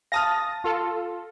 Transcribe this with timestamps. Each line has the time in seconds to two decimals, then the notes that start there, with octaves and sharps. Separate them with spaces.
0.12 F5 A5 D#6 F6 A6 A#6
0.64 F4 A4